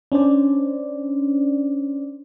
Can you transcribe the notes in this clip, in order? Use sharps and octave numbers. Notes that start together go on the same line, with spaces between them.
C#4 D4 C5 D5